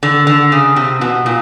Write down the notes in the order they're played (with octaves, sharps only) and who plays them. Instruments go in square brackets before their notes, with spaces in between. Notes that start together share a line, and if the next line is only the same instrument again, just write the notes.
[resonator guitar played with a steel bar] D3
D3
C#3
C3
B2
A#2